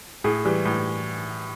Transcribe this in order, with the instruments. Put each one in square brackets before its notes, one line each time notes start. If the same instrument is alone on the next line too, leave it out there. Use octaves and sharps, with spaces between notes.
[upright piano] A2 G#4
E3 G3
A2